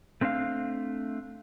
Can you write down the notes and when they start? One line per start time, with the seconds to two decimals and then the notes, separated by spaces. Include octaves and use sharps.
0.21 A3 C4 D4 D5 F5